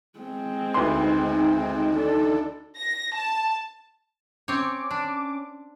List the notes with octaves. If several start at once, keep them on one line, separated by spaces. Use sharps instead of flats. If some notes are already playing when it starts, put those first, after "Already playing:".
G#3 C4
D2 D#4 B4 C6
D4 A4
A#6
A5
C4 C#4 C#5 D6
D4